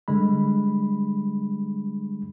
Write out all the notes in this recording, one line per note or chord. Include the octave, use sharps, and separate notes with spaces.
D3 G3 G#3 B5